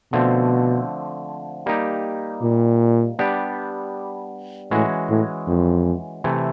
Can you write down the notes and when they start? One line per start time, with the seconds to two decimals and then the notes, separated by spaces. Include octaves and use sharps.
0.13 B2 D3 F3 A3 C4
1.66 G3 A#3 D#4 G4
2.42 A#2
3.19 G3 B3 D4 G4
4.71 A2 E3 G#3 C#4 F#4
5.10 A2
5.47 F2
6.24 C3 E3 A3